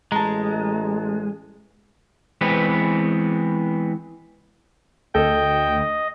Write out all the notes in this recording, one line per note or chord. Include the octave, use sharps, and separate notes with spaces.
A1 G#3 A5 A#5
E3 G#3 B3 C4 B4
D2 A4 D#5 G5